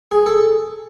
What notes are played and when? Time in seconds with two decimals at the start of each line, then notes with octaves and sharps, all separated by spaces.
0.11 G#4
0.26 A4